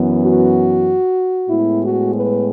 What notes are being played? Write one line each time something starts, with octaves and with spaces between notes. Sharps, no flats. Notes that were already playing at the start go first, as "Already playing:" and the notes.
Already playing: F#2 E3 B3
F#4
A2 G#3 B3 E4
F#4
B4